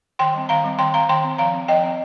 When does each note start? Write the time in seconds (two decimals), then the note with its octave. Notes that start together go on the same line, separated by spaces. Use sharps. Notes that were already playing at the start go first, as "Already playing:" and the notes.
0.19 D#3 G5 C6
0.34 G3 C4
0.49 D#3 F5 A#5
0.64 G3 C4
0.79 D#3 G5 C6
0.94 C4 F5 A#5
1.09 D#3 G5 C6
1.24 C4
1.38 F3 F5 A#5
1.54 C4
1.68 F3 D#5 G5
1.84 C4